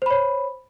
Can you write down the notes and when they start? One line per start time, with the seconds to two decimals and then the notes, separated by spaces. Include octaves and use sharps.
0.02 C5
0.06 B5
0.10 C#5